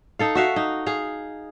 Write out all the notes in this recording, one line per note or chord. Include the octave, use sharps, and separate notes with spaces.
D#4 A4 F5
F#4 E5 F5
D#4
G#4 F5